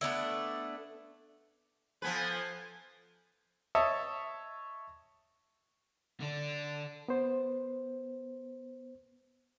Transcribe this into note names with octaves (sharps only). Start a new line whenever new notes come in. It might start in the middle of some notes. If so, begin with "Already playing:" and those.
A3 B3 D4 E4
F3 B3 A4 B4 C5 G#5
C#5 D#5 E5 A5
D3 D4
B3 C5